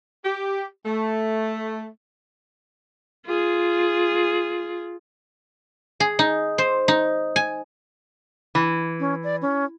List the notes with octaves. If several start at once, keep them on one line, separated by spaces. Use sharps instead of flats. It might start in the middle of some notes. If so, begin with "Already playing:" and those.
G4
A3
F4 G#4
G#4
D#4
C5
D#4
G#5
E3
C#4
D5
C#4